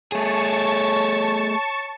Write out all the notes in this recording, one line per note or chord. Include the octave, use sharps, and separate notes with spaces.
A3 G#4 C#5 A5 C#6